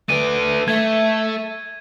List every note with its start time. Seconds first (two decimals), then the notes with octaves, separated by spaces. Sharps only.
0.09 A3 B4 D5 D#7
0.68 A3 E5 G#6